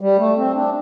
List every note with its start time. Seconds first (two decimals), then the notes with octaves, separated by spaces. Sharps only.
0.01 G3
0.18 A3
0.36 C4
0.54 D4